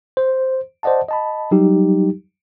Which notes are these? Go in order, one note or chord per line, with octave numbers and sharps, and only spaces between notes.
C5
C5 D5 D#5 F#5 A5
D#5 A5 B5
F#3 G3 D#4 G4